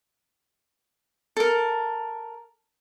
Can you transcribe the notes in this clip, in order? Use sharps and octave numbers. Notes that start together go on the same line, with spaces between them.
A4 A#4